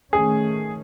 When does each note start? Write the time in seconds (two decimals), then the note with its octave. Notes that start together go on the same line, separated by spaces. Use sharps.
0.12 D#3 A3 C#4 G#4